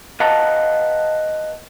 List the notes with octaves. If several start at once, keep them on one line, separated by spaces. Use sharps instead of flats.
B4 D#5 F5 F#5 A5 A#5